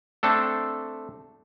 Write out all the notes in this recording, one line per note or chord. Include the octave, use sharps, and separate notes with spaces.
A3 C4 D4 A4